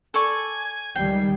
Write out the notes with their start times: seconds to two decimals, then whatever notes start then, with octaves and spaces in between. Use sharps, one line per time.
0.14 A4 D5 G#5 C#6
0.95 C#2 D#3 G3 G5 C7